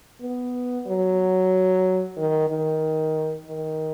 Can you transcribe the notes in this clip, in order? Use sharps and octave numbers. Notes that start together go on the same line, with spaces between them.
B3
F#3
D#3
D#3
D#3